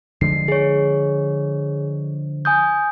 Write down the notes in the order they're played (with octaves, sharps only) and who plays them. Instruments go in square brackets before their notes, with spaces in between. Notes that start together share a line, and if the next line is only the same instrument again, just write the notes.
[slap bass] D3 F3 G#3 [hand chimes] C7
[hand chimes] G#4 C#5
G#5 D#6 G6